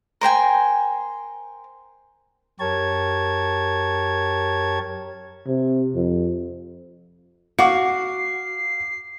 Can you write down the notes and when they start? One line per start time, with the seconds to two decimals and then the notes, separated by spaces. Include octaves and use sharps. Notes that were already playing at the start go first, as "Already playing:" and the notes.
0.21 A#4 C5 G5 G#5
2.60 F#2 G4 A#4 C#5 A5 G#6
5.47 C3
5.95 F2
7.59 F#4 F5 F#5 D6 C7